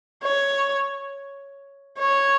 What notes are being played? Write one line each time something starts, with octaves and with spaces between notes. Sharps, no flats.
C#5
C#5